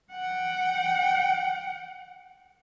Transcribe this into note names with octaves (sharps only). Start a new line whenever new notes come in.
F#5 G5